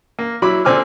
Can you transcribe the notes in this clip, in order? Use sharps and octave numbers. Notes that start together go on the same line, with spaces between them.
A#3
F#3 E4 B5 D6
A#2 D3 C4 G#5 D6 F6